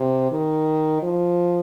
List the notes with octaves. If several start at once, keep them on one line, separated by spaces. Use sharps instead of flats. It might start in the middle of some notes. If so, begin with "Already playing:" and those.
Already playing: C3
D#3
F3